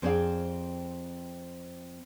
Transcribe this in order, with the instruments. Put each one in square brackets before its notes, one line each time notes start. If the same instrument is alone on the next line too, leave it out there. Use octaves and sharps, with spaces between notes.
[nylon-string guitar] F2 C4 G#4 C5 D5 F5